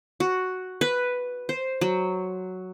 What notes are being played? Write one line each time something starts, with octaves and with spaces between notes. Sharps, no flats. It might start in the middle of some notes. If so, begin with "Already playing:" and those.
F#4
B4
C5
F#3